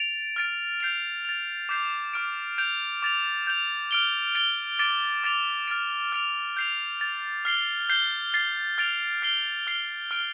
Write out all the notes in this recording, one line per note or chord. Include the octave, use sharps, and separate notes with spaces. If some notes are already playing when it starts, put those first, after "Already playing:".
Already playing: A6 D7 F7
F6 A6 D7
G6 C7 F7
A6 F7
D6 G6 C7 F7
D6 F6 D7
G6 D7 F7
D6 A6 F7
G6 F7
F6 D7 G7
A6 D7 G7
D6 A6 D7
D6 A6 D7 F7
F6 A6 D7
F6 D7 F7
G6 C7 F7
A6 F7
F6 C7 G7
G6 C7 G7
A6 C7 G7
F6 A6 D7 F7
F6 C7 G7
F6 C7 G7
F6 D7 G7